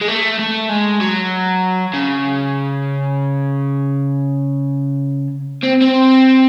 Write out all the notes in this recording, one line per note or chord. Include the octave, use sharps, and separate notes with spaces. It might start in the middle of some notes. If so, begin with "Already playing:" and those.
G#3
A3
A3
G#3
F#3
C#3
C4
C4